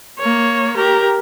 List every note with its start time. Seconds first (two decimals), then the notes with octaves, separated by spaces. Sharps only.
0.19 A#3 C#5
0.76 G4 A#4